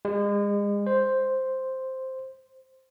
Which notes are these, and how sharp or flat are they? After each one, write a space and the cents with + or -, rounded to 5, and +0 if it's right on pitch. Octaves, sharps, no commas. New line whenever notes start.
G#3 -35
C5 +0